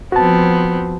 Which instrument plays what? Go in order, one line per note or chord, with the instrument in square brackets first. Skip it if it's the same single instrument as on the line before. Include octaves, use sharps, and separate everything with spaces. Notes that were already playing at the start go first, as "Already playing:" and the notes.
[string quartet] F3 B3 C4 [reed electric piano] F#4 A5